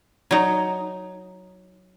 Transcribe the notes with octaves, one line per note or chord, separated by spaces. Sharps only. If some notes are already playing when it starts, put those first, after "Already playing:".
F#3 D#4